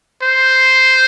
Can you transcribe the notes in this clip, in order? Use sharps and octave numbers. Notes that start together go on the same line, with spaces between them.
C5